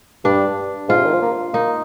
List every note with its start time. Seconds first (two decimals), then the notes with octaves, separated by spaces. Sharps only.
0.25 G2 D4
0.89 G#2 F4
0.98 C3
1.06 D#3
1.13 F3
1.22 A#3
1.53 A#3 D#4